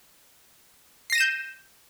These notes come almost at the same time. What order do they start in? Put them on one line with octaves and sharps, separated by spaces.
C7 A#6 D#7 E7 G6